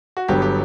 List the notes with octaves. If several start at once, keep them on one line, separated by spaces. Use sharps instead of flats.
F#4
G1 G2 F#3 B3 G4
G4